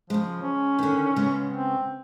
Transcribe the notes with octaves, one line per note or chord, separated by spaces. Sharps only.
C#3 F3 G#3
C#4
D3 D#3
C#3 G#3 B3
C4